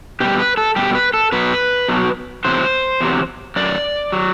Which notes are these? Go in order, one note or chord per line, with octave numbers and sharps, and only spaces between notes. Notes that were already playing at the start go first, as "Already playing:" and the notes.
B2 G3 G4
B4
A4
B2 G3 G4
B4
A4
B2 F#3 B4
B2 F#3
E2 C3 F#3 C5
E2 C3 F#3
F#2 F#3 D5
F#3